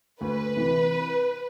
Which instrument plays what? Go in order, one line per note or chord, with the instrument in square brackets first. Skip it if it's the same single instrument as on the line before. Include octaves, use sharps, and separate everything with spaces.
[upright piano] D2 [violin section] B4
[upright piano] C3 E3